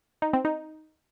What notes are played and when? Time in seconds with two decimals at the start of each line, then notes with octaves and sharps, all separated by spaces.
0.22 D#4
0.33 C4
0.45 D#4